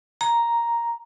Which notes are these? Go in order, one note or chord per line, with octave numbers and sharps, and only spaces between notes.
A#5